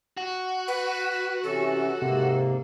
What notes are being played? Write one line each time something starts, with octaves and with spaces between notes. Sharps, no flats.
F#4
B4
C3 E3 C#4 A4
G#2 C3 A#3